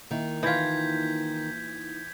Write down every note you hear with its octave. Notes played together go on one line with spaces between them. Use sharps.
D#3 A#3 D#4 E4
E3 F4 G6 G#6 B6